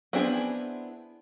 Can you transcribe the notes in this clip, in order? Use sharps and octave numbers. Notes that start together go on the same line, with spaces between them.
B3 C4 D4 E4 G#4